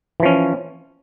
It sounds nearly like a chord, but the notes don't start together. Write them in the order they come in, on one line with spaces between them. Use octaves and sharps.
E3 F3 C#4